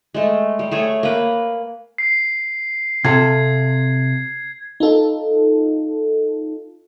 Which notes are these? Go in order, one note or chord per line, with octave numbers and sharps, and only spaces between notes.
G#3 A3
G3
A3 G#4 C#5
A#3 B4
C7
C3 F4 A4 G#6
D#4 F4 A4